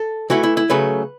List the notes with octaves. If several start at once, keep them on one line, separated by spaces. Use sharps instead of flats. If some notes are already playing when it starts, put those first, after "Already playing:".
Already playing: A4
E3 A3 E4 F#4
E4
E4
C#3 F#3 A3 B4